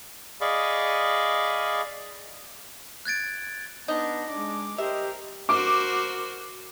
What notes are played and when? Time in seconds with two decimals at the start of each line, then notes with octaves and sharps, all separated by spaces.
0.41 G#4 D5 D#5 F5 B5 C#6
3.05 F#6 G#6 A6 D7
3.88 B3 D4 D#4
4.30 G#3 D4 D6
4.78 G4 A#4 C5 D#5 E5
5.49 F#4 A#4 C5 D6